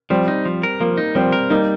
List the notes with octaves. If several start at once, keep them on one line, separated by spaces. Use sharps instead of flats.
F3 G3 C4
D#4
F3
A#4
F3 A#3
D#4
F3 G3 C4
A#4
G3 A#3 D#4